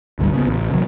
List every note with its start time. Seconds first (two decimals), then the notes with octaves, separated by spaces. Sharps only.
0.19 G#1 D2 C#3 G3
0.33 C#3 A#3 B3
0.47 A1
0.71 C3 D#3 F#3